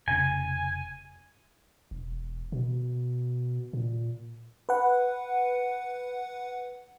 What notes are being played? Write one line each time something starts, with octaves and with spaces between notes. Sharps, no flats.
F1 C#3 G#5
E1
B2
A#2
B4 F#5